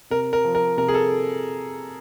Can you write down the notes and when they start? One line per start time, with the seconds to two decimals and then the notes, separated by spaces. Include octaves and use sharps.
0.10 C3 A#4
0.33 A#4
0.45 F3
0.55 A#4
0.77 C3 A#4
0.88 G#4
0.94 A4